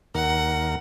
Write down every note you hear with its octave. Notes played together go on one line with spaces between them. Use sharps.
D#2 A#4 F#5